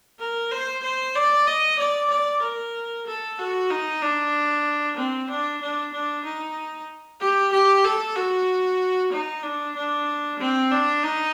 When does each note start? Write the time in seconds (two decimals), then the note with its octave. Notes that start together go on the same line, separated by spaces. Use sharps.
0.19 A#4
0.51 C5
0.83 C5
1.15 D5
1.46 D#5
1.79 D5
2.10 D5
2.42 A#4
3.07 A4
3.39 F#4
3.70 D#4
4.02 D4
4.97 C4
5.29 D4
5.61 D4
5.93 D4
6.24 D#4
7.20 G4
7.53 G4
7.85 A4
8.16 F#4
9.12 D#4
9.43 D4
9.75 D4
10.39 C4
10.71 D4
11.03 D#4